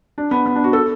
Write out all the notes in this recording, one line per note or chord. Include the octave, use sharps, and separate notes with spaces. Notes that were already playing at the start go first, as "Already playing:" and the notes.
D4
B3
B3
D4
F#4
A4